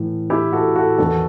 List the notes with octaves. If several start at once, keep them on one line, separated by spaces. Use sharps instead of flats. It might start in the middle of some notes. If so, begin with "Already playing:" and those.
Already playing: A2 E3
E4 G4
F#4 A4
F#4 A4
E2 D#3 F#4 A4